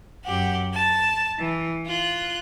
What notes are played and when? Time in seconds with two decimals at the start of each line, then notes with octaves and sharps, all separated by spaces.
0.25 F#2 G4 F#5
0.74 A5
1.38 E3
1.85 F4 F#6